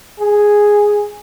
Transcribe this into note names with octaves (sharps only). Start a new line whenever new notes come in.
G#4